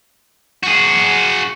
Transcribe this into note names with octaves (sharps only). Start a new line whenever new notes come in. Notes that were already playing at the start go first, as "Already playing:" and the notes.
F#4 G#4